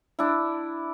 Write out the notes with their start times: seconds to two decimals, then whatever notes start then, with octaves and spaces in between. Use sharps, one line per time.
0.19 D4 E4